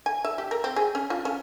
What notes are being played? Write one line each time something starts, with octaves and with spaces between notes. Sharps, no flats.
G#5
E5
G4
A#4
C4
G#4
C#4
F4
C#4